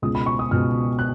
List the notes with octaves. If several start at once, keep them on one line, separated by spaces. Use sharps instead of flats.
C#2 B2 D#6
B5
C#6
D#6
C#2 B2 F6
F#6